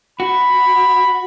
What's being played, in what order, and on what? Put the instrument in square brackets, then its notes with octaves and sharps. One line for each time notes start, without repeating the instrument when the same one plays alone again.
[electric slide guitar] F#4 [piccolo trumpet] B5